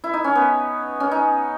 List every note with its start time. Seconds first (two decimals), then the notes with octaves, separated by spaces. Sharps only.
0.04 E4
0.14 D#4
0.24 C#4
0.35 B3
1.00 C#4
1.11 D#4